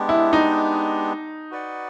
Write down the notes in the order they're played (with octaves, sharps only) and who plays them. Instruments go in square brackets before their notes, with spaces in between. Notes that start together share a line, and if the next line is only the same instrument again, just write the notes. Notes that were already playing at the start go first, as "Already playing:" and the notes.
Already playing: [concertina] G#3 B3 D4 G4
[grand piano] E4
D#4
[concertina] F#4 B4 D5 F#5